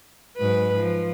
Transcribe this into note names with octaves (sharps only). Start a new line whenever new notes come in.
G#2 F#3 B4
F3